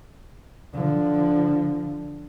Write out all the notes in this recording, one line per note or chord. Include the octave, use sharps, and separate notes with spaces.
D3 F3